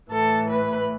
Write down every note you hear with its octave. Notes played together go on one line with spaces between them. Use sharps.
A2 E3 A4
B4